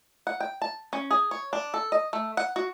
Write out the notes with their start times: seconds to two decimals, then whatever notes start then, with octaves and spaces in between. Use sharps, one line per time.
0.27 F#5
0.41 G5
0.62 A5
0.93 C#4
1.11 G#4
1.31 C#5
1.53 D4
1.74 A4
1.92 D#5
2.13 A3
2.37 F#5
2.56 F#4